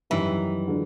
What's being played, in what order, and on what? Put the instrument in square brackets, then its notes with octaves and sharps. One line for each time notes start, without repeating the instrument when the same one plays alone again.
[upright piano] F#2 D#3 G3 [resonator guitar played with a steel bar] E3
[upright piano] D3 F3 G#3